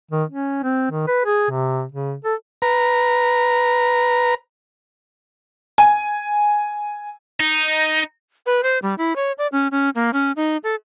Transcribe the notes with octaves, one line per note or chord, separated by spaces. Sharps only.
D#3
C#4
C4
D#3
B4
G#4
C3
C#3
A4
B4 A#5
G#5
D#4
B4
C5
G3
E4
C#5
D5
C#4
C#4
A#3
C#4
D#4
A4